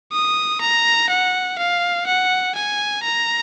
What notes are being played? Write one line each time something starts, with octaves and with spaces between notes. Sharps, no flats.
D#6
A#5
F#5
F5
F#5
G#5
A#5